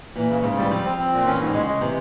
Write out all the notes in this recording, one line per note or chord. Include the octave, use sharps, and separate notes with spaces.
A#2 E3
C#3
G#2 C#3
E3 G3
F3 C4
C4
C4
A#2
E3 C#4
G#2
C3
C#3 G#3
G#3
C3 E3